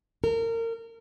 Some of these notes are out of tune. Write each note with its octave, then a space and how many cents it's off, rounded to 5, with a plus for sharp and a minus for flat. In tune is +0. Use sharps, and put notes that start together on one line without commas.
A#4 -30